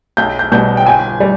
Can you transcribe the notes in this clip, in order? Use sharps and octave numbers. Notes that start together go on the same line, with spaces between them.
B1 G6
G6
B2 G3 G6
G5
G1 G#5
G3